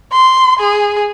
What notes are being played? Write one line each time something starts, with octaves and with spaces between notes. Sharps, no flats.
C6
G#4